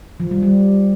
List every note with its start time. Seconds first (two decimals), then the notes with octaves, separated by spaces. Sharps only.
0.20 F3
0.31 G3
0.43 G3